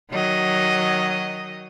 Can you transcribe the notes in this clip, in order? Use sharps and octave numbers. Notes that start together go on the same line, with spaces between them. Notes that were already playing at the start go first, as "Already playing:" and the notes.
D#3 F#3 D#5